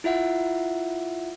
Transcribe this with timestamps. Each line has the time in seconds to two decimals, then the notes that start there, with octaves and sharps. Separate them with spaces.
0.04 E4 F4 E5 F#5